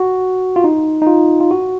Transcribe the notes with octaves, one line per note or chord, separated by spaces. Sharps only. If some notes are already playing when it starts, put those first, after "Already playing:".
Already playing: F#4
F4
D#4
D#4
F4
F4
F#4